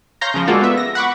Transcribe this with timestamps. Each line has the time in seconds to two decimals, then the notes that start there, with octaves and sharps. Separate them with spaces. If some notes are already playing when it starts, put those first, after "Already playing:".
0.21 C#5 F5 A#5 C6 G6 A#6
0.34 C#3 F3
0.47 G#3 A#3 F4 F#4 A4 D5
0.62 B3 E5
0.77 A#6
0.95 F#5 B5 C#6 D6